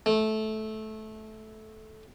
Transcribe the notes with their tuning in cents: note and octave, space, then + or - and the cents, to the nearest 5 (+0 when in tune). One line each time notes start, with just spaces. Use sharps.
A3 -15